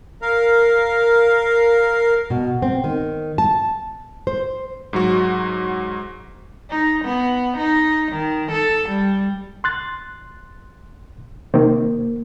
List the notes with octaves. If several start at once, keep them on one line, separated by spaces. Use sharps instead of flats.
A#4 F5
B2
C4
D#3
A5
C5
G#2 F#3 F#4
D#4
B3
D#4
D#3
A4
G3
C6 F#6 A6
C3 D#3 A#3